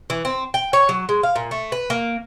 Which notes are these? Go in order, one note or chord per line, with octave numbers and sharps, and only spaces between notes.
E3
C4
G5
C#5
F#3
G#3
F5
A#2
A3
B4
A#3